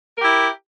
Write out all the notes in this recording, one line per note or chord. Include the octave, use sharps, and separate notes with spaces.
E4 G4 A#4